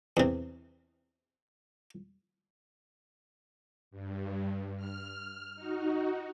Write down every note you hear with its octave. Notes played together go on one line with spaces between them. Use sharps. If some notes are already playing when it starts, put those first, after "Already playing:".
E2 C3
G2
F6
D#4 F#4